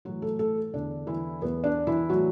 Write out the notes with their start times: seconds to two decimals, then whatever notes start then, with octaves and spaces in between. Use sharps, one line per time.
0.05 A2 E3 F#3 F#4
0.22 A3 A4
0.39 A3 A4
0.73 E2 D3 D4
1.07 E3 E4
1.42 E2 E3 B3
1.64 D4
1.87 E3 E4
2.09 A2 E3 F#3 F#4